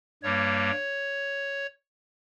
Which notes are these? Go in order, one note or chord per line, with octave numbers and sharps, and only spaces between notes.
G2 G3 A#3 C#5